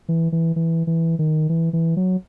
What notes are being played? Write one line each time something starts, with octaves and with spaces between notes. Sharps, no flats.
E3
E3
E3
E3
D#3
E3
E3
F#3